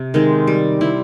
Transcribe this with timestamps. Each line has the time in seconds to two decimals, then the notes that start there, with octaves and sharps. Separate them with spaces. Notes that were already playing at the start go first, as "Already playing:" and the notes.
Already playing: C3
0.14 D#3 G#3 C4
0.47 G3
0.81 C4 E4